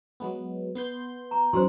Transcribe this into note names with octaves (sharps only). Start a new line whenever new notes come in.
F#3 G#3 B3
B3 C6 G6
A#5
F#2 E3 D#4 C5 C6